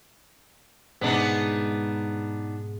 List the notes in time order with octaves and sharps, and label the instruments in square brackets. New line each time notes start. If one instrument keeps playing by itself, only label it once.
[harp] G#2 B2 [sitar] B3 D4 D#4